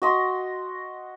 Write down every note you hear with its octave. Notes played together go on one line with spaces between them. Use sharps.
F#4 D#5 C6